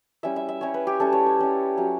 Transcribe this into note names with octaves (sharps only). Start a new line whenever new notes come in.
G3 C#4 E4 E5
E5
E5
G3 C#4 E4 C#5
B4
G4
G3 C#4 E4 A4
C#5
C#5
G3 C#4 E4
F#3 C#4 E4